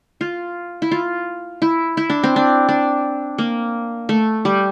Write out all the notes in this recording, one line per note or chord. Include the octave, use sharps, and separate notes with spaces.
F4
E4
F4
E4
E4
D4
C4
D4
D4
A#3
A3
G3